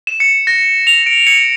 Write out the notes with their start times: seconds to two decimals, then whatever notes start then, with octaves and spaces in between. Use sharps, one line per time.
0.07 E7
0.20 C#7
0.47 A#6
0.87 F7
1.06 D7
1.27 C#7